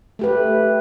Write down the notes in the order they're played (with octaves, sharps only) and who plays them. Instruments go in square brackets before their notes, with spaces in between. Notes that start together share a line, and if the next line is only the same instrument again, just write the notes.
[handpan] A3 G4 B4